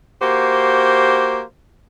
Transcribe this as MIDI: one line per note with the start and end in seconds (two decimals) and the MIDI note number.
0.22 1.42 58
0.22 1.42 66
0.22 1.42 67
0.22 1.42 72